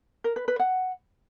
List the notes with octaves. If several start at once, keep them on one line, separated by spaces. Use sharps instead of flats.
A#4
B4
B4
F#5